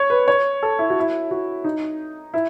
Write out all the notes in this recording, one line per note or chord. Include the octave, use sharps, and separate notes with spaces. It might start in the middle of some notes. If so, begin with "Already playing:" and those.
Already playing: C#5
B4
C#5
A4
E4
F#4
E4
F#4
D#4
E4